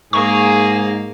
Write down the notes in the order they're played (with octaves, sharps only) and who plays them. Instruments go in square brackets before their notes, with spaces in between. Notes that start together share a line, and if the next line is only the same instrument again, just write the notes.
[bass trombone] G#2 [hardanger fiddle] A#3 [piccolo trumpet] G#4 [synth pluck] C#6